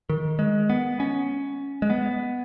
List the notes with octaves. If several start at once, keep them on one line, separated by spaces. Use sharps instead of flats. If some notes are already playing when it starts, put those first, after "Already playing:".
D#3
G#3
B3
C#4
G#3
B3